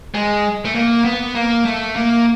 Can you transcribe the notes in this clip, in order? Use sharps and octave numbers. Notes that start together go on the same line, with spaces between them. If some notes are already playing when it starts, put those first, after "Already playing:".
G#3
A3
A#3
B3
A#3
A3
A#3